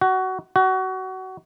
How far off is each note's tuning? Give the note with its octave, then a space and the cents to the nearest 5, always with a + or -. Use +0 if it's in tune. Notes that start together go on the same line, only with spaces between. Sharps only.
F#4 +20
F#4 +25